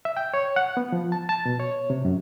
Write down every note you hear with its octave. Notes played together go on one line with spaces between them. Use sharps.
E5
G5
C#5
F#5
B3
F3
A5
A5
B2
C#5
C3
F#2